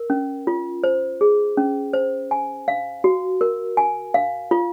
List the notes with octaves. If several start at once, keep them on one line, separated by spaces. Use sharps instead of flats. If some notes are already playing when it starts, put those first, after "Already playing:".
Already playing: A#4
C#4
F4
C5
G#4
C#4
C5
G#5
F5
F#4
A#4
G#5
F5
F4